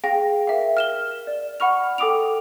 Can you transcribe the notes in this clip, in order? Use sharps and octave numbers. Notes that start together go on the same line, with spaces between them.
G#4 F5 G5 A#6
A#4 E5 F5
F6 E7 G7
D5
F#5 B5 C#6 F6 F7
A4 G5 D6 D#6 D7 F7